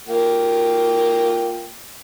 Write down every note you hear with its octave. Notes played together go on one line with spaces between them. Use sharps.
A#3 F4 G5